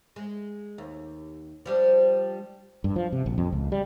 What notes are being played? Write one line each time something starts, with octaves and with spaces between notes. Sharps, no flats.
G#3
D#2
F3 G3 D4
G2
F3
C3
A#1
F2
C#2
G3